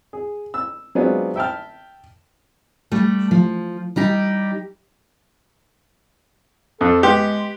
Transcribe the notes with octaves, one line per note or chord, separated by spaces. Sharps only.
G#4
E6
F#3 G#3 B3 C4 D4 F4
E5 G5 A5 F6
G3 A3
F3
G3 D#4 G4
F2 A4
G#3 B3 G4